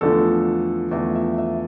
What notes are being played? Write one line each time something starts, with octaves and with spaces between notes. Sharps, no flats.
E2 D3 F3 A3 A4
E2 D3 F3 A3 E5
E5
E5